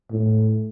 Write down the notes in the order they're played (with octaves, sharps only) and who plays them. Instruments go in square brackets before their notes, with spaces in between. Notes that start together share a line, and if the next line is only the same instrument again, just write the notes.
[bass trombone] A2